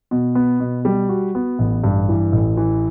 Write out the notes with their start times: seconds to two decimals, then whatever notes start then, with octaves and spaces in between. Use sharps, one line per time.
0.11 B2
0.35 B3
0.60 B2
0.85 G3
1.09 F#4
1.35 B3
1.59 A1
1.84 G2
2.09 E3
2.32 A1
2.57 E3